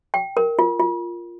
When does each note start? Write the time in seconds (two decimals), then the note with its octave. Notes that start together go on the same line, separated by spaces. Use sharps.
0.14 G5
0.37 A#4
0.59 F4
0.80 F4